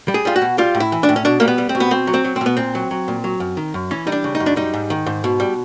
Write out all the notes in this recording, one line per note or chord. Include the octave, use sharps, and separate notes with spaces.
G3
G#4
G3 F4
F#4
B2
G3 F4
A2
E4
E3
D4
A2
C#4
B2 D4
G3 A#3
B3
G3
C4
B2
B3
B2 C4
F#3
C4
F#3
C4
B2 B3
A#2 C4
F#3
F#3
A#2
F#3
F#2
D#3
F#2
E3 C#4
G3 D#4
D4
C#3
D#4
F#2
D4
G3 D#4
G#2
D#3
G#2
B2
G3